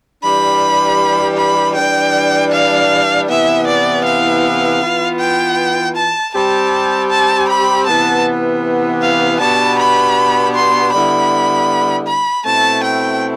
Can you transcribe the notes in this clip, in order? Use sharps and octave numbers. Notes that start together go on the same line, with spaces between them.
E3 G3 D4 G4 B5
B5
E3 G3 D4 G5
F5
C3 E3 B3 E4 E5
D5
F5
E3 B3 F4
G5
A5
G3 C4 G4 A5
A5
B5
C3 E3 B3 A5
F5
B2 B3 D4 G4 A5
B5
C6
D3 G3 B3 E4 B5
B5
B2 A3 C4 E4 A5
G5